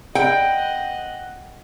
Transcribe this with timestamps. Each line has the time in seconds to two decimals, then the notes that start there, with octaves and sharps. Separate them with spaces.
0.15 D#5 F#5 G5